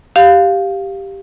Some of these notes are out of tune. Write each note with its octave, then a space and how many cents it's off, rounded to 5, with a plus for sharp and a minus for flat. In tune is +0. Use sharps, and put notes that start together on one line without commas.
G4 +0 F5 +5